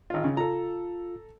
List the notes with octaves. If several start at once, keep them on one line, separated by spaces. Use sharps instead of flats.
G#1 F4
C#3
F4 A4 A#5